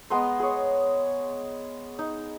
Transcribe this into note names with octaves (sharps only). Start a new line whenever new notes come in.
G#3 B3 A#5 C6
G#4 C#5
D#4